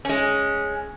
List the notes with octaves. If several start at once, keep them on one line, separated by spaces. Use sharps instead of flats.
G#3 C#4